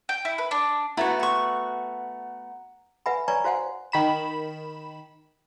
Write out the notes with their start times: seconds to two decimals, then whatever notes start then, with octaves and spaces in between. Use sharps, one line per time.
0.09 G5
0.25 E4
0.38 B4
0.51 D4
0.97 A3 B3 E4 F#4 F#5 A#5
1.19 E5 C#6
3.06 B4 E5 F#5 G#5 B5
3.28 B4 C#5 D5 G#5 A#5 C#6
3.44 F#4 C5 F5 F#5 G#5
3.92 D#3 B5 E7